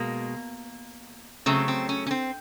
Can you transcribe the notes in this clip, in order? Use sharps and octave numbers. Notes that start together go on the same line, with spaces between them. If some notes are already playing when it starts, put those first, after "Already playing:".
Already playing: B2 G#3 A#3
C#3 F#3 A3 C4
C4
C#4
C#4
C4